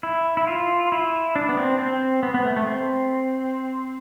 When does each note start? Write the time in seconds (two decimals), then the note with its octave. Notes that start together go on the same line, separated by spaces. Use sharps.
0.03 E4
0.37 E4
0.47 F4
0.92 E4
1.36 D4
1.49 B3
1.57 C4
1.79 C4
2.23 B3
2.34 B3
2.45 A3
2.56 A3
2.66 C4